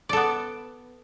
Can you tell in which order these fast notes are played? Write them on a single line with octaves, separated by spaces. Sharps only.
D5 A4 B3